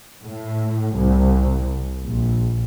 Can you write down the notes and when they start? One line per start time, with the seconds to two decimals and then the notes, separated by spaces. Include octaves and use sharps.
0.23 A2
0.96 C2
2.04 A#1